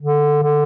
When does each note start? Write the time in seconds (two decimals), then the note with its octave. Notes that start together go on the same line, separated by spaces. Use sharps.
0.01 D3
0.43 D3